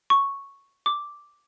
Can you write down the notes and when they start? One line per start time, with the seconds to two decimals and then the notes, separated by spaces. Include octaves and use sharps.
0.10 C#6
0.86 D6